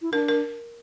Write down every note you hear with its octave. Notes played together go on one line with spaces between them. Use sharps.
E4
D4 A#4
A#4